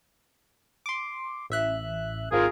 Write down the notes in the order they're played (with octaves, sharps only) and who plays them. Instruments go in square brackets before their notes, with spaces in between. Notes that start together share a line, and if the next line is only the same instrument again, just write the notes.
[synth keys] C6 D6
A1 E5 F#6
[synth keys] G#1 [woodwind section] F4 G#4 A#4